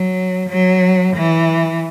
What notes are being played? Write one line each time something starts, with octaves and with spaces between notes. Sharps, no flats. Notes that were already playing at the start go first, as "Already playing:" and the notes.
Already playing: F#3
F#3
E3